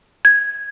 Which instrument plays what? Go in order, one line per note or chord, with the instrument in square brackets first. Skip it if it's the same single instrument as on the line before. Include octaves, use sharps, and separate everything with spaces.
[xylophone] G#6